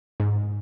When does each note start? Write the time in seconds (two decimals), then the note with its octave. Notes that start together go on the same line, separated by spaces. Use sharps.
0.20 G#2